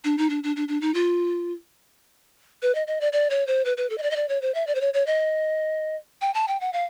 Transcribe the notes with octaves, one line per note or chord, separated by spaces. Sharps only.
D4
D#4
D4
D4
D4
D4
D#4
F4
B4
D#5
D#5
D5
D5
C#5
C5
B4
B4
A4
D#5
D5
D#5
D5
C#5
C5
E5
D5
C5
C#5
C#5
D#5
G5
A5
G5
F#5
F5